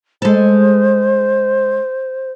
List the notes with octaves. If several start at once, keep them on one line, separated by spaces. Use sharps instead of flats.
G#3 A4 C5